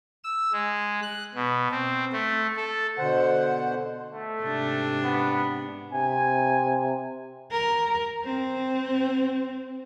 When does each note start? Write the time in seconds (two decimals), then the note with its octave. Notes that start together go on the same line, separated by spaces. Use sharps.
0.24 E6
0.53 G#3
1.02 F#6
1.35 B2
1.71 C4
2.13 A3
2.56 A4
2.97 B2 D3 C5 F#5
4.12 A3
4.42 G#2 C3 D4
5.04 B3
5.93 C3 G#5
7.52 A#4
8.24 C4